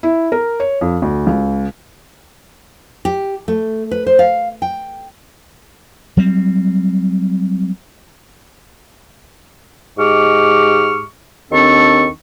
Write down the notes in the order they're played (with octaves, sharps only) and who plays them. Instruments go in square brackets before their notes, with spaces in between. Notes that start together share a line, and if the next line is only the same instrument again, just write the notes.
[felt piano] E4
A#4
C#5
F2
D2
C#2
[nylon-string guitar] G4
A3
B4
C5
F5
G5
[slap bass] F#3 G3 C4
[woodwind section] G#2 G#3 G4 C#6 D6 F6
D#2 D#3 C4 D4 A4 C#6